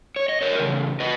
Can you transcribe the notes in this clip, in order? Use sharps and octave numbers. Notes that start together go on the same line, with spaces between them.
C#5
D#5
A#4 C#5
E2 C#3
B4 D#5